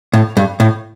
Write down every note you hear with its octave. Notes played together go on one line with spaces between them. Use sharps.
A2
G2
A2